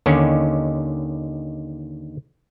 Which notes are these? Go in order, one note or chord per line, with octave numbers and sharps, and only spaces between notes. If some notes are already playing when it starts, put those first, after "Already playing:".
D#2 D3 D#3 C#4